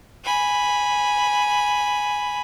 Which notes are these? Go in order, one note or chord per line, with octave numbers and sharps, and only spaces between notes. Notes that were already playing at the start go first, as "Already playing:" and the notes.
G#5 B5